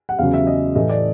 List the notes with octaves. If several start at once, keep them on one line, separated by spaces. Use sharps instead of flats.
F#5
E2 C#3 F#3 F5
E5
D#5
A2 E3 A3 D#5
D5